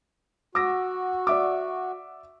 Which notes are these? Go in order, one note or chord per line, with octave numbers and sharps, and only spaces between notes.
F#4 D6 E6 A#6
D5 E5 D6